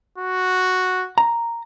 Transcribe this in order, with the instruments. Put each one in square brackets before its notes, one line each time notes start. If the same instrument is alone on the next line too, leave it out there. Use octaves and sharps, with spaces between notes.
[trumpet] F#4
[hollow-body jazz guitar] A#5